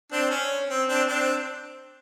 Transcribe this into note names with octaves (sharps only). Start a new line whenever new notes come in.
C4 D4
C#4
C4
C4 D4
C4 D4